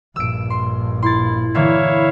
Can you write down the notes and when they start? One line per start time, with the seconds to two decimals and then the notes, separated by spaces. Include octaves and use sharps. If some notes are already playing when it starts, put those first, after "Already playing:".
0.16 A#1 G2 E6 D7
0.50 C6
1.02 E4 C6 A6
1.55 D3 E3 A#3 C#5 E5 F5